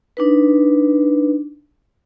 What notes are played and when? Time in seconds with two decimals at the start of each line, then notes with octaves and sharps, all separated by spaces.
0.17 D4 D#4 B4